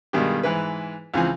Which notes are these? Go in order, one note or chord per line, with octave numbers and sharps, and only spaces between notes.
G2 B2 D#3 G#3 B3 G4
G#2 E3 E4 B4
C#2 E3 F3 C4 G#5